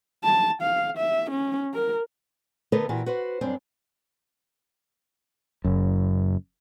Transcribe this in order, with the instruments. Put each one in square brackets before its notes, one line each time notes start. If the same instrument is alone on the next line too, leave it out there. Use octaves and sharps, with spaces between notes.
[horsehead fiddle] A5
F5
E5
C#4
A#4
[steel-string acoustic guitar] D3 A3 B3 A4 A#4
A#2 E3 F#4 G4
F#4 B4 C5
F#2 G3 C4 D4
[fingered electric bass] F#1 F#2